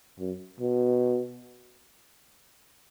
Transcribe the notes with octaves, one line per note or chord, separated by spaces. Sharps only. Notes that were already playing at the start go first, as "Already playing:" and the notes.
F#2
B2